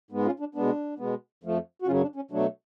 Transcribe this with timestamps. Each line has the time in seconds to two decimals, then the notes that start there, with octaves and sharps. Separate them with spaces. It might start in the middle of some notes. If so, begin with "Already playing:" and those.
0.11 G#2 G#3 B3
0.25 C#4 F4
0.40 D4
0.55 B2 G#3 B3 D4
0.98 B2 G#3 B3
1.43 F2 F3 A3
1.82 F#4
1.86 F#2 C#3 F#3 C#4 F4
2.02 D4
2.16 C#4
2.31 B2 F#3 A3 D4